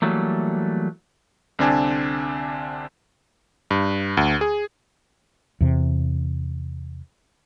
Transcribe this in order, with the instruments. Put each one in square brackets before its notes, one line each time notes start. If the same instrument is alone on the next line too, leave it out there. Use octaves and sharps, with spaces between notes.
[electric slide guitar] E3 F#3 G3 A3 A#3
[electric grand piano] C2 D3 C4 D4 G#5 A5
G2
D2
G#4
[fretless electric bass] E2 C3